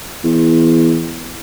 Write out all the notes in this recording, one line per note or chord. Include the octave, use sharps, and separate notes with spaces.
E2